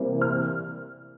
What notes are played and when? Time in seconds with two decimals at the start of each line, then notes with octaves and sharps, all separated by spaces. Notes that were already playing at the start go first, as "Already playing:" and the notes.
Already playing: C3 E3 G3 A#3
0.21 F6